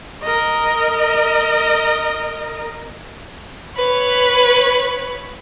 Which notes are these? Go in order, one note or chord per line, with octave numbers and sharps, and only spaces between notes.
A#4 D#5
B4 C#5